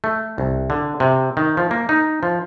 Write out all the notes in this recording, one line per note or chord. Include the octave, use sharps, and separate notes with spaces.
A3
C2
D3
C3
D#3
F3
A#3
D#4
F3